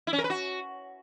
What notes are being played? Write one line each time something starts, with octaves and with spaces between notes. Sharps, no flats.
E4
C#4
A#4
B4
F#4